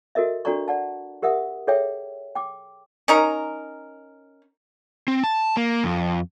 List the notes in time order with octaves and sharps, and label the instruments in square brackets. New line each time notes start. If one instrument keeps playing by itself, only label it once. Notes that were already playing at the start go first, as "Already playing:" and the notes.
[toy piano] F#4 A4 A#4 D#5 E5
D4 F#4 A4 D5 A#5 C#6
D5 F#5 A5
G4 A#4 E5 F#5 D#6
G#4 A4 C#5 E5 G5
G5 D6
[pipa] C#4 D#4 A#4
[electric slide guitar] C4
A5
A#3
F2